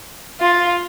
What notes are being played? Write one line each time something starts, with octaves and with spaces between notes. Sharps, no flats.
F4